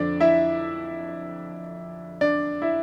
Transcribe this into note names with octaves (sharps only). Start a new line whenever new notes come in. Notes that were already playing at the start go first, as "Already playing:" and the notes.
Already playing: F2 D3 F3 D4 D5
E4 E5
D4 D5
E4 E5